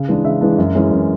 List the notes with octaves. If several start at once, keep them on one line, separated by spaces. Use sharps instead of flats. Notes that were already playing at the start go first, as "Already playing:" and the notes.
Already playing: C#3
E3 G#3 D4
C#3 E5
E3 G#3 D4
F#2
E3 G#3 C#4
F#2